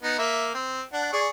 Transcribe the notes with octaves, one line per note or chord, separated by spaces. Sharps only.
B3 D#4
A#3 E5
C4
D4 F#5
G#4 D5 C#6